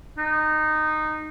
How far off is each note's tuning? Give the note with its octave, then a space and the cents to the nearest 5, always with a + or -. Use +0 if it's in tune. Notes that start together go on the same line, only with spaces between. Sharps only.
D#4 -15